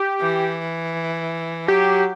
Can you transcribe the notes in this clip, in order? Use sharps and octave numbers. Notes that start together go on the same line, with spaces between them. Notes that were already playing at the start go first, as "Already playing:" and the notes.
Already playing: G4
E3
F#3 G4